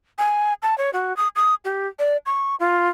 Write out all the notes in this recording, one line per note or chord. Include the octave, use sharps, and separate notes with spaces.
G#5
A5
C#5
F#4
D#6
D#6
G4
D5
C#6
F4